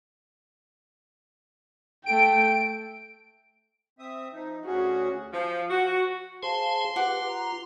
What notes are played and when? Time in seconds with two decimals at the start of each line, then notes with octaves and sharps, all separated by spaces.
2.06 A3 G5 D7
3.99 C4 E5 D#6
4.32 F3 D#4
4.66 D2 C#4 F#4 G#4
5.32 F3
5.69 F#4
6.43 G#4 C5 F5 G#5 A5 C6
6.96 F4 G4 B4 F#5 D6
7.28 A#5